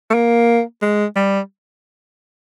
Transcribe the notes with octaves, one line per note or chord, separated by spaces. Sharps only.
A3
A#3
G#3
G3